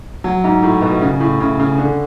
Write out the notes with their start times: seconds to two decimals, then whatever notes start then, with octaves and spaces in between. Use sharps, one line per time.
0.24 F#3
0.44 G#2
0.63 A2
0.82 B2
1.01 C#3
1.20 A2
1.40 C#3
1.59 C#3
1.78 D3